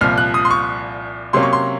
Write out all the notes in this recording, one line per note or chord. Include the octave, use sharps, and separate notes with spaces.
C2 A#2 F3 F6
F#6
D#6
C6
C#6
C3 F#3 A#3 C#4 C6
C#6
C6